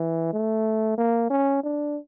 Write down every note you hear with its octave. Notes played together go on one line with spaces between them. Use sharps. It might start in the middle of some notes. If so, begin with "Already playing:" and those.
Already playing: E3
A3
A#3
C#4
D4